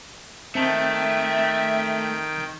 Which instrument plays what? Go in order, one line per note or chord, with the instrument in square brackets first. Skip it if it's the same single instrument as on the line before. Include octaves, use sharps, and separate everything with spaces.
[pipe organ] D#3 G5 [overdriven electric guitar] A3 [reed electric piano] C4 A5 [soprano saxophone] E5